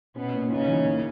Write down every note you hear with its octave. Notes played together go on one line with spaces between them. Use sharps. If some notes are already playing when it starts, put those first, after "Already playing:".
B2 B3 C#4
A#2
C#3 C#4 D#4
E3
A#3